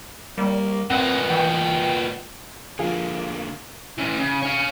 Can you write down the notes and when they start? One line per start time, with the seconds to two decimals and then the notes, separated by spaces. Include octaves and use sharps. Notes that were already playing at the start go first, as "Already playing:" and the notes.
0.38 G3 A#3
0.90 A#2 B3 C4 F#5
1.30 E3 G5
2.79 D3 F3 A#3 G#4 F5
3.98 E3 C#4
4.19 C#3
4.42 C#5 F5